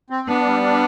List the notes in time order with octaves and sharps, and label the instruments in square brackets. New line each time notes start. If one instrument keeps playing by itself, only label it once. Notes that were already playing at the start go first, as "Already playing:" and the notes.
[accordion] C4
[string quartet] B3 [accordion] D4
[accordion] G3
D4